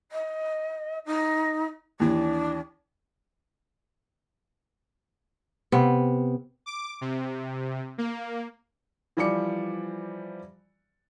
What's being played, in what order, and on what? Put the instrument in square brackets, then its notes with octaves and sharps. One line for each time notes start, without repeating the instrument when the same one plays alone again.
[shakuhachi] D#5
D#4
[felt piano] D#2 E3 [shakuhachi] D4
[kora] C3 B3
[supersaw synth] D6
C3
A#3
[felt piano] E3 F3 G3 D5 D6 C#7